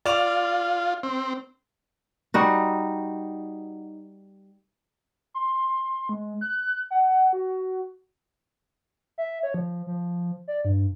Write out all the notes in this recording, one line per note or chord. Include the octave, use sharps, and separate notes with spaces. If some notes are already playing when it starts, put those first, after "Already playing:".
F4 D5 F7
C4
G3 D#4 F#4
C6
G#3
F#6
F#5
F#4
E5
C#5
F3
F3
D5
G2